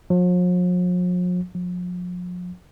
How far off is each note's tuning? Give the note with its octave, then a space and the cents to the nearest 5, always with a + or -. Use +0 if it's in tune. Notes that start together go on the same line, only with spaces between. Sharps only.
F3 +45
F3 +40